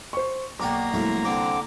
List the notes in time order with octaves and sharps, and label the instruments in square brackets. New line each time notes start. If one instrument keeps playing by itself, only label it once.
[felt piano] C5 C#6
[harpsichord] B1 F#4 D5 [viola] A#3 A#5 [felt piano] G5 D6
[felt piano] C2 [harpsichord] F3 F#3 A3
[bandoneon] D3 D6 [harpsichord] C4